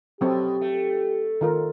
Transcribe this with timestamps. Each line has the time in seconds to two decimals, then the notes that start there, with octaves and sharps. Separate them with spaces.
0.21 B2 F#3 C4 G4 A4
0.61 A3
1.41 D#3 F4 A#4